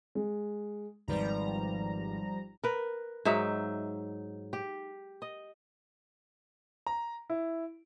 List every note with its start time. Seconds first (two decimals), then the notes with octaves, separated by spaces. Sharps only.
0.15 G#3
1.08 G#1 F3 G3 B4 D5 A#5
2.64 A#4 B4
3.25 G#2 F#3 D#4 E5
4.53 G4
5.22 D#5
6.87 A#5
7.30 E4